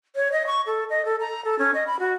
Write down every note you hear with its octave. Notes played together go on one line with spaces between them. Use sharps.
C#5
D#5
C#6
A4
D#5
A4
A#5
A4
C#4
D#5
B5
F#4